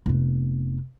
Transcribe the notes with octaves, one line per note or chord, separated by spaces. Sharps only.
F1 B3